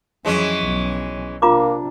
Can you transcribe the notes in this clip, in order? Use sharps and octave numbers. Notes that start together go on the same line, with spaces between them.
F2 E3 F#3 G#3 C#4
B1 F#3
C3 A#3 D4 F4 A#5 D6